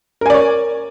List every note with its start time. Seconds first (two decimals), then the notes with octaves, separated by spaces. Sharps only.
0.21 A#4
0.26 G#5
0.30 D5
0.34 C#5